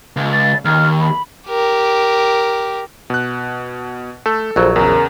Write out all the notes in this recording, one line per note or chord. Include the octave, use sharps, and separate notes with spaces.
C#2
A6
D#2 F6
B5
G4 A#4
B2 F#6
A3 A4
A#1 F2 F#3
E2 C#3 A#4